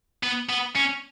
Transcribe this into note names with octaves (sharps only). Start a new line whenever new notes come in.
B3
B3
C#4